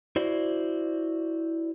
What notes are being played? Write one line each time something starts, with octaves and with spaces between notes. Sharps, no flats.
E4 F#4 C5 D5